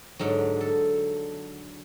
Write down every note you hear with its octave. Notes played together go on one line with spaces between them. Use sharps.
G#2 D3 F#3
A4